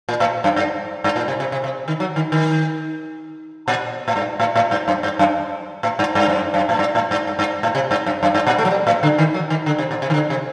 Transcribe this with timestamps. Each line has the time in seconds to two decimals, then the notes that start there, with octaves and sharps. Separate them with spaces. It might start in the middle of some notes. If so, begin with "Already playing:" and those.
0.09 A#2
0.20 A2
0.44 F#2
0.56 G2
1.04 G2
1.16 A#2
1.28 C3
1.40 C3
1.52 C3
1.64 C3
1.88 D#3
2.00 F#3
2.16 D#3
2.32 D#3
3.68 A#2
4.08 A2
4.16 G2
4.40 A2
4.56 A2
4.71 G2
4.88 F#2
5.03 G2
5.19 F#2
5.83 A2
5.99 G2
6.15 G2
6.28 F#2
6.54 F#2
6.69 A2
6.79 G2
6.95 A2
7.11 G2
7.27 G2
7.39 G2
7.63 A2
7.75 C3
7.91 G2
8.06 F#2
8.23 F#2
8.35 G2
8.47 A#2
8.58 A3
8.65 F#3
8.70 G3
8.87 A2
9.03 D3
9.18 D#3
9.34 F#3
9.50 D#3
9.66 D3
9.78 C3
9.91 A#2
10.02 C3
10.10 D#3
10.14 D3
10.30 C3